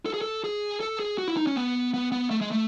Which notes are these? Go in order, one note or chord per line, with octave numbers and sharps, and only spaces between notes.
A4
G#4
A4
G#4
A4
G#4
F#4
E4
D#4
C#4
B3
B3
B3
A3
G#3
A3